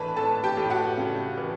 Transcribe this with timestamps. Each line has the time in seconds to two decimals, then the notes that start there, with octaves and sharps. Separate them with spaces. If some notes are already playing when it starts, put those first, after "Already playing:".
Already playing: A2 E3 D4 B4 A5 B5
0.16 A2 A4 A5
0.44 G4 G5
0.57 A2
0.70 F#4 F#5
0.97 C#3
1.38 E3